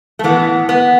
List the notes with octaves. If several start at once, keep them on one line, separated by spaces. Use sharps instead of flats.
A3
A2 E3 B3
B3